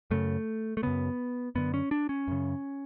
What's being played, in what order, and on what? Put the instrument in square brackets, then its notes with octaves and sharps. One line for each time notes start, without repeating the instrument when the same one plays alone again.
[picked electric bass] F#2 C#3 A3
A3
F#2 C#3 B3
F#2 D3 B3
C#4
D4
C#4
F#2 C#3